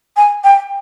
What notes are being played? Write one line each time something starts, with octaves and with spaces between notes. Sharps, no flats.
G#5
G5